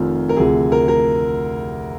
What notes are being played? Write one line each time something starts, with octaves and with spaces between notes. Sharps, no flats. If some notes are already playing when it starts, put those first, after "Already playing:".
Already playing: F1 F2 D#3 F4
A#4
D2 C3 F3 G#4
A#4
A#4